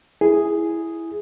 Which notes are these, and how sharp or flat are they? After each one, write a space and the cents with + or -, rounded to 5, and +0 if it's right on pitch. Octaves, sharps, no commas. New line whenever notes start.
E4 +0 G#4 +0